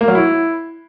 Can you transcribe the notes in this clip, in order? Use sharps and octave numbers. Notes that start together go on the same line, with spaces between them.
A#3
F#3
E4